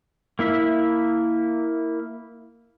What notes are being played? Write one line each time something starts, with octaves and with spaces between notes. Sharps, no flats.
A#3 E4 E5